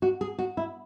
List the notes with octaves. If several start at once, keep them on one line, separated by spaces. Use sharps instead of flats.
F#4
G#4
F#4
E4